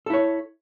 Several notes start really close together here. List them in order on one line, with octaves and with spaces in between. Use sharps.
A4 E4 C#5